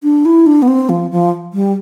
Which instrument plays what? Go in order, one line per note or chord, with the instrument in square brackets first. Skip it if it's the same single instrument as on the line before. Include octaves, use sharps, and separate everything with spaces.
[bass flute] D4
E4
D4
B3
C4
F3
F3
G3